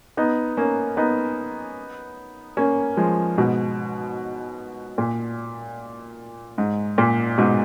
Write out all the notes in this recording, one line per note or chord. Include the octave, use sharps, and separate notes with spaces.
B3 D#4
A#3 C#4
B3 D#4
A#3 C#4
F3 G#3
G#2 B2
A#2
G#2
A#2
G#2 B2